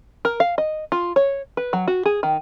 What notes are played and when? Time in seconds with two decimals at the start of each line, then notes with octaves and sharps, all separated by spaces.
0.25 A#4
0.40 F5
0.58 D#5
0.92 F4
1.16 C#5
1.57 B4
1.73 F#3
1.88 F#4
2.06 G#4
2.23 D#3